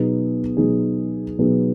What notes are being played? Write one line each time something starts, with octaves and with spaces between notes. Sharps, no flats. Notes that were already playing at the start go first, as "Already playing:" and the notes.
Already playing: B2 F#3 B3 D#4 G#4
B2 F#3 B3 D#4 G#4
B2 F#3 B3 D#4 G#4